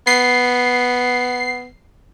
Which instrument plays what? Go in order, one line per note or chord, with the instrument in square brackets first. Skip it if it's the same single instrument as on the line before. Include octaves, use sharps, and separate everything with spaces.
[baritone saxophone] B3 [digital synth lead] C7